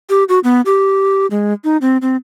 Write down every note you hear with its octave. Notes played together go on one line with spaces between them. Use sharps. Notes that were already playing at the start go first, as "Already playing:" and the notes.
G4
F#4
B3
G4
G#3
D#4
C4
C4